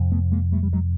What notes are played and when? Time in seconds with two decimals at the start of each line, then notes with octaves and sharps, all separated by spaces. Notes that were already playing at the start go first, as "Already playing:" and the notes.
Already playing: F2 C3
0.12 A3 B3
0.32 G#3 A#3
0.52 G3 A3
0.63 G3
0.73 F#3 G#3